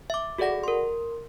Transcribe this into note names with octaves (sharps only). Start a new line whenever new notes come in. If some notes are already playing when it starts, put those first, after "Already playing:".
E5 D6
F#4 G#4 A4 D5 F#5 A#6
A#4 C6